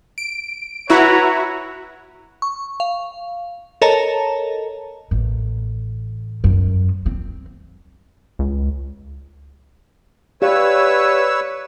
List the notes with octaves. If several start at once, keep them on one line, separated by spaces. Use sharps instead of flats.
D7
E4 F#4 B4 C#5 A#5
C#6
F5
A4 A#4 C#5 D#5 A5 A#5
A1
F#2
C4
C#2
G4 B4 C#5 D5 F5 E6